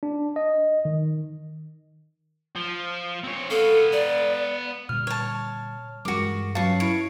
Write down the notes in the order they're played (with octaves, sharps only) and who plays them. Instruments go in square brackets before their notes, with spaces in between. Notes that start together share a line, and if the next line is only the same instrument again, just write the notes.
[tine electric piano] D4
D#5
D#3
[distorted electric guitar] F3
C4 C#5
[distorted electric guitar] B3 F5 [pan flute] A4
[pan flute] D5
[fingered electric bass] A#2 D3 G3 [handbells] F6
[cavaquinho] C#5 A5
[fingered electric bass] G2 E3 G3 [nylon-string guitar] G#3 A#4 [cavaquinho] F#4 D6
[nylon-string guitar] F#3 C#4 B4 [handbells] F5 [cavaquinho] A5 C#6
[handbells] E4 D7 [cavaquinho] C#5